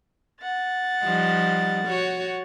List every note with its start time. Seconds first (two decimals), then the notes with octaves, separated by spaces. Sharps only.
0.42 F#5 A6
1.03 F3 G3 D#4
1.85 F#4 C#5